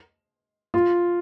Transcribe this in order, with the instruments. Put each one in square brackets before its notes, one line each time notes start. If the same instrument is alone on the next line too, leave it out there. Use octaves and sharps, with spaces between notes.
[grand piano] F4